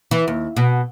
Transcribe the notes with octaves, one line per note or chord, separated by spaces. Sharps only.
E3
D#2
B2